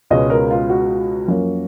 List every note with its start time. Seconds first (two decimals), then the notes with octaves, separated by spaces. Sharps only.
0.10 C#2 B2 G#3 C#4 D#5
0.30 A#4
0.51 F4
0.69 F#4
1.28 F#2 F3 A#3 C#4